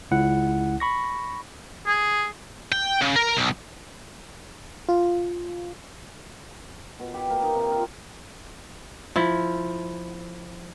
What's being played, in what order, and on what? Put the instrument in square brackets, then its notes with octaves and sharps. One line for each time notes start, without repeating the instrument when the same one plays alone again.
[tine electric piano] C#2 E4 F#5
B5 C#6 A#6
[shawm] G#4
[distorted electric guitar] G5
C#3
A#4
B1
[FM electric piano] F4
[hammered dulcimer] B2
G4
A#3
D#4
C3
F4
[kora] F3 E4